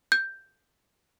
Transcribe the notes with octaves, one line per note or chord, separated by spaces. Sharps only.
G6